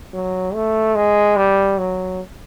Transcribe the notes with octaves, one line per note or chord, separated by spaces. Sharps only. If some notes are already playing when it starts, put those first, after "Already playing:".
F#3
A3
G#3
G3
F#3